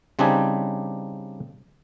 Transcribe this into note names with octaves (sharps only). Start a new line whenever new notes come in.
C#3 G3 C4 D4 D#4 G#5